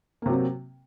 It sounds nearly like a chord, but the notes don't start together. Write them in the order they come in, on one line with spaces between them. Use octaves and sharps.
A#3 C3 F#3 C4